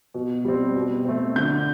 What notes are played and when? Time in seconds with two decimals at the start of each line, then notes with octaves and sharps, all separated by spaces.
0.14 B2
0.45 G3 C4
0.75 B2
1.05 A3 C4
1.35 D3 G6